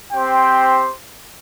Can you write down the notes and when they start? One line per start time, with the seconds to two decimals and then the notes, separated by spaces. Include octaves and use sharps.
0.12 C4 G4 C5 G5